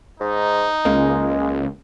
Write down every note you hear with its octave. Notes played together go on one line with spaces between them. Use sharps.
G#2 D#4
C#2 C#3 G#3 A#3